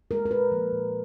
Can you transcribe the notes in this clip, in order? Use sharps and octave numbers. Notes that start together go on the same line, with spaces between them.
G#3 A#4
A#4
A#2 B4
F3 A#3
A#2